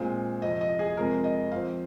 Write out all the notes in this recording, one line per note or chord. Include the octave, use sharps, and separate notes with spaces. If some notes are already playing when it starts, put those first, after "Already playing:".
Already playing: A#2 G#3 C4
F2 C3 F3 D#5
D#5
G#4
F2 C3 F3 G#3 A#4
D#5
F2 F3 C4 F5